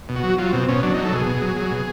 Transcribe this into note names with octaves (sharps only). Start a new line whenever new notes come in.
B2
F#4
F#3
F#3 F4
B2 C4
B2 C#4
F#3 D4
F#3 D#4
A4
B2 G#4
B2
F#3
F#3
B2